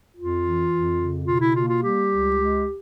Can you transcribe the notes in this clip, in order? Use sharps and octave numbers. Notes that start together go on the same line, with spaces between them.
F2 F4
E3
F2
C#3
B2 F4
E4
A#3 F4
F4
G3 G4
C#2
G#3